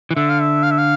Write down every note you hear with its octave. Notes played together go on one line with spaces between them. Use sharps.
E3
D3 E5
F5
E5
F5
E5
F5